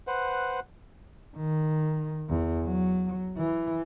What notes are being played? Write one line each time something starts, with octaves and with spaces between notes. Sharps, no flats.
B4 C5 F#5
D#3
E2
F#3
E3